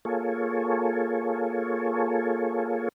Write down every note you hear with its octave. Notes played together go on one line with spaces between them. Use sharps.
A#3 F4 G#4 A4 C#5